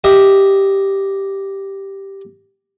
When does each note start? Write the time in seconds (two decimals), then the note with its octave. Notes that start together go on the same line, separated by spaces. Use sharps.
0.04 G4 D#5 E5